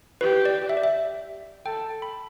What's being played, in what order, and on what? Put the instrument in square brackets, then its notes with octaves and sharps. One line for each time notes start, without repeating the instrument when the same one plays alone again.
[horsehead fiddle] G4 [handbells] B4
[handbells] D5
E5
D5
E5
[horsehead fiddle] A4 [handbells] G5
[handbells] B5